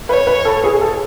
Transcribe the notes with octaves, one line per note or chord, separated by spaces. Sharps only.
B4 C#5
B4
A4
G#4
A4